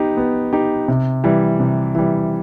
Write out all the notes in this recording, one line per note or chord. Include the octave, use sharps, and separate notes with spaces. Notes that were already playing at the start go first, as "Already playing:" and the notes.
Already playing: B3 D#4 G4
B3
D#4 G4
C3
E3 G3
C3
E3 G3